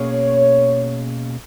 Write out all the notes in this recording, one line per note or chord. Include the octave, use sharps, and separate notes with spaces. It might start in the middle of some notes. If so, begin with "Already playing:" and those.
Already playing: B2 A#3 C#4 G#4 C#5